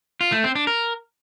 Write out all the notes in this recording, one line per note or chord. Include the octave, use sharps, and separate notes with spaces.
F4
A3
C4
D4
A#4